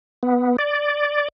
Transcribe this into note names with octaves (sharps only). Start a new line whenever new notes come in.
B3
D5